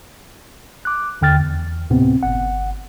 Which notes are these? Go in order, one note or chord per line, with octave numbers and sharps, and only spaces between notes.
D6 F#6
D#2 D3 G5 F6 A6
E2
D2 A2 C3 B3 C4
G1 F#5